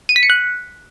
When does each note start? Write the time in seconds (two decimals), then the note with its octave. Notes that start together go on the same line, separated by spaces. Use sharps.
0.09 D#7
0.16 B6
0.23 C#7
0.30 F#6